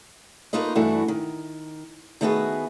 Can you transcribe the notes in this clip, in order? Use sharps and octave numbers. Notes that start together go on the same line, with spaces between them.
A3 A#3 D#4 F4 B4 D#5
G2 E3 A3 D4 E4 F#4
D#3
D#3 A3 B3 F#4 G#4 B4